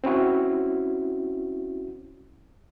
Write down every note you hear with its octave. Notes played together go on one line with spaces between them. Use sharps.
C4 C#4 E4 F#4